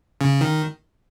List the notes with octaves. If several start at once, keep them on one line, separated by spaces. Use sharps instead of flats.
C#3
D#3